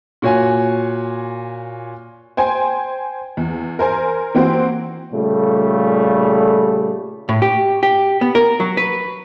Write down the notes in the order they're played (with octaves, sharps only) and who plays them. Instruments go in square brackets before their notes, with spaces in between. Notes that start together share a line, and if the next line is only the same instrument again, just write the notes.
[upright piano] A#2 F#4 C#5 G#5
[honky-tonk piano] C5 G5 G#5
E2
A#4 C5 G#5
E3 A#3 C4 F#4 C5
[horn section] A#2 C#3 G3 A3
[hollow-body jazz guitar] A2
G4
G4
B3
A#4
F#3
B4